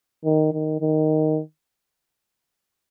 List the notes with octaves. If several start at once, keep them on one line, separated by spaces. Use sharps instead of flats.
D#3
D#3
D#3